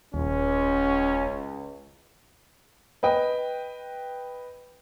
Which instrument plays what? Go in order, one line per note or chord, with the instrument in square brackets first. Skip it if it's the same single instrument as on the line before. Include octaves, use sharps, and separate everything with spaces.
[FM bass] D#1 [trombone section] C#2 [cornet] C#4
[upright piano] B4 D#5 G5